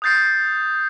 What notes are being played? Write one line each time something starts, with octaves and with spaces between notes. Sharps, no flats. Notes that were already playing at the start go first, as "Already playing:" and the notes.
D#6 F#6 G6 A6 C7